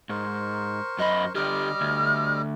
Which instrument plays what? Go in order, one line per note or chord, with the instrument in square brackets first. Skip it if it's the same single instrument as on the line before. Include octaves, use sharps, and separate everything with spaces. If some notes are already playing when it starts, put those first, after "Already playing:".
[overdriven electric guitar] G#2 [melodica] A#4 C5 C#6
[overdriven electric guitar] F#2 B5 [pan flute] D#5
[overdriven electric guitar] D3 G4 [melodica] G3 D#5 D6 [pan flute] F6
[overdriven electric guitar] D2